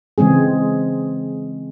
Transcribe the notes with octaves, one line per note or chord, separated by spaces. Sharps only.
C#3 E3 G#3 C4 G#4